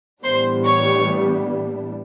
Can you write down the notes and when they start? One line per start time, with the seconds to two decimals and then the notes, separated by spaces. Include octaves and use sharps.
0.23 A2 E3 G3 B3 D4 C5 C6
0.65 C#5 C#6